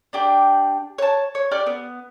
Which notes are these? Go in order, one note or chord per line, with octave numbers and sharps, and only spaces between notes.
D4 G4 G5 D6
C#5 A5
C#5
G4 D5 F6
B3